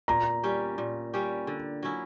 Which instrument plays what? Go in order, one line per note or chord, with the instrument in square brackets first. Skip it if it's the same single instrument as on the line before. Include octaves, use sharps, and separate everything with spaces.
[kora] A#2 [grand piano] A#5
[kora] G3 C#4 G4
A#2
G3 C#4 G4
D3
F#3 C#4 E4